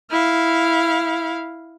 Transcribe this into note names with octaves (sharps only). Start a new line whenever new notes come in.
E4 F5